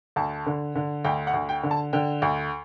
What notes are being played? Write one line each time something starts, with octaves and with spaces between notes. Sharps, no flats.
D2 A5
D3
D3
D2 G5
F#5
D2
G5
D3
A5
D3 G5
D2